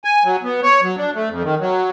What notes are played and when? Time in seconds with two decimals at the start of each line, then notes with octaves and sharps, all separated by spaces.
0.04 G#5
0.24 F#3
0.43 B3
0.63 C#5
0.83 F#3
0.98 D4
1.14 A3
1.29 F2
1.43 D#3
1.60 F#3